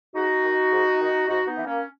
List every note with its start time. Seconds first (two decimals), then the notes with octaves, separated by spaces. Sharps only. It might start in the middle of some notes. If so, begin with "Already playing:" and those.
0.14 G#2 D#4 F#4
0.43 D#3
0.71 G#2
0.99 D#3
1.27 G#2 D#4 F#4
1.46 B3 D#4
1.56 E3
1.65 A#3 C#4